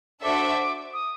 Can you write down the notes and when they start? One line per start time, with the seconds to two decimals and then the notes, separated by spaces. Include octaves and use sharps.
0.23 D4 F#4 A4 C5 E5 D6
0.93 D#6